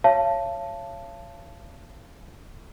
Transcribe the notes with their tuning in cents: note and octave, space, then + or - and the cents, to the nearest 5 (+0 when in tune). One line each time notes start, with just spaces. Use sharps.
C#5 +0 F5 -35 A5 +0